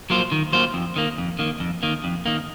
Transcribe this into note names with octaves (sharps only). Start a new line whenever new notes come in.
F#3 A#3 F4 C5
D#3
F#3 A#3 F4 C5
F2
D#3 A#3
F2
D#3 A#3
F2
D#3 A#3
F2
D#3 A#3